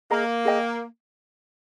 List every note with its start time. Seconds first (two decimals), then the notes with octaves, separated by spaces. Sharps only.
0.10 A#3 G#4 D#5 A#5
0.45 G#4 D#5 G5